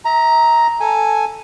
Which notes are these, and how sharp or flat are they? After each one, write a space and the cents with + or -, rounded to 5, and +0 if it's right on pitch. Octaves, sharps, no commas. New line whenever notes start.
E5 -45 A#5 +0
A4 +0 G#5 +0